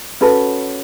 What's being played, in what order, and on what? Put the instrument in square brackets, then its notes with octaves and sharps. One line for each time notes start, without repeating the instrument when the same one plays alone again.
[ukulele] C#4 F#4 A4 B4